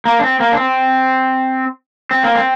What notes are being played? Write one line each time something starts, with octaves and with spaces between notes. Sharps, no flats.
A#3
D4
C4
A#3
D4
C4
C4
A#3
C4